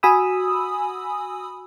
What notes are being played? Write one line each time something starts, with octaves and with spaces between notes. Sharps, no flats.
F#4 G#5 B5 D#6 E6